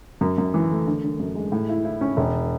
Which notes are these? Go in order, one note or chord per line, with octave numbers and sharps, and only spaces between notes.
F#2
F#2
E3
A3
D3
D3
F#2
G#3
A2
E4
E4
C#4
E1